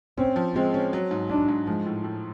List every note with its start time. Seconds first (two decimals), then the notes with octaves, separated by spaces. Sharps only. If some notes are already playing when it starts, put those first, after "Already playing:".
0.18 C4 C#4
0.36 F3
0.55 G#3 C4
0.74 C#4
0.93 F#3
1.11 G#2
1.30 G#2 D4
1.48 G#2
1.67 F3 G#3
1.86 A2
2.04 A2